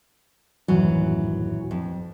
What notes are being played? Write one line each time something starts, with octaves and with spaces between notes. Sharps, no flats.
D#1 A1 F#2 E3 F#3
F2